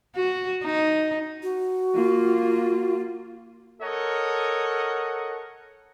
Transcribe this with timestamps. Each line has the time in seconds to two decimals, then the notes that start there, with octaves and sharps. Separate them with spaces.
0.15 F#4
0.64 D#4
1.43 F#4
1.95 A#3 F4
3.82 A4 A#4 C#5 D#5 F#5